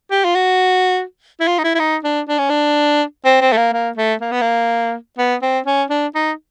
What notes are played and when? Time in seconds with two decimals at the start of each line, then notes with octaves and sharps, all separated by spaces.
0.11 G4
0.24 F4
0.35 F#4
1.40 E4
1.48 F4
1.59 D#4
1.64 E4
1.75 E4
1.80 D#4
2.04 D4
2.28 D4
2.38 C#4
2.50 D4
3.25 C4
3.41 C4
3.53 A3
3.57 A#3
3.73 A#3
3.97 A3
4.21 A#3
4.31 B3
4.41 A#3
5.18 B3
5.42 C4
5.66 C#4
5.90 D4
6.15 D#4